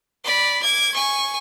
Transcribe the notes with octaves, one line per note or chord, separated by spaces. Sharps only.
D5 B5
D6 G#6
G#5 C#6